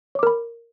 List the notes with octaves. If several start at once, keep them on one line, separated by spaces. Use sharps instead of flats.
A#4 C#5 B5 D6